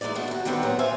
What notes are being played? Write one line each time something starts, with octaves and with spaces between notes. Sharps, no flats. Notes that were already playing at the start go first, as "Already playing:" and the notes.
E3 G#3 A#3 D#4 D5
G#3 A3 B3 D4 F#4
D#2 F#4
D3 D#3 G3 A3 B3 C4
E2 A#2 F#3 G4 G#4
A#3 B3 C5 E5 F5 G#5